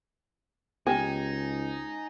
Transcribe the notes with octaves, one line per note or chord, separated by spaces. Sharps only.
C#2 B3 D#4 G4 G5 G#5